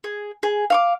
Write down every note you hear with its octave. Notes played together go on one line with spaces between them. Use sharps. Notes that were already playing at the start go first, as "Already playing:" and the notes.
G#4
G#4
F5 C#6 D6